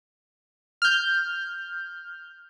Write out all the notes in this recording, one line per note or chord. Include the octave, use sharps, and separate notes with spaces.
F6 G6